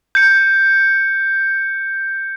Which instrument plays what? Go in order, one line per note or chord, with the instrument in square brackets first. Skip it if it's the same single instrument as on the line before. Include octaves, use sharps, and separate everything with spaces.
[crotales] G6 C#7